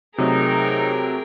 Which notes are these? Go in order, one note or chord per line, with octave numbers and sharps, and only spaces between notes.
C3 F#3 A3 D#4 G#4 A#4 G5